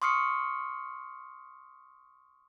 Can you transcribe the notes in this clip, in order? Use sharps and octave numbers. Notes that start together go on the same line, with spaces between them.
C6 C#6 D#6 F6 C7 C#7